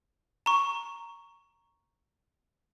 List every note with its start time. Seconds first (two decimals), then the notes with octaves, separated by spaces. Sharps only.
0.46 A#5 C#6